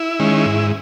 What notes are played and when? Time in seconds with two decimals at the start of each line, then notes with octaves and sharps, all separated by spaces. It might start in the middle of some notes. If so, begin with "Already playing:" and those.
Already playing: E4
0.20 D#3 G#3 C#4
0.46 G#2